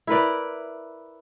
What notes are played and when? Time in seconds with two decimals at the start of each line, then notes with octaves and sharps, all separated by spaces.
0.07 E4 A#4 B4 D5